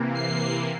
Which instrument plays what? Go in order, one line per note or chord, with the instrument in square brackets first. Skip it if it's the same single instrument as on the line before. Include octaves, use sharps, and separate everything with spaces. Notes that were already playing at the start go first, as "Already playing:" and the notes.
Already playing: [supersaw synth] C3 E3 A#3
C7